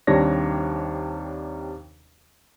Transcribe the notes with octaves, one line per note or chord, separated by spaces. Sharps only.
D#2 C3 G3 D4 C#5 A#6